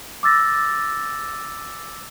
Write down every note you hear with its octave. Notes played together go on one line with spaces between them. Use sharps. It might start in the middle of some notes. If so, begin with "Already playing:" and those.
D6 E6 A6 A#6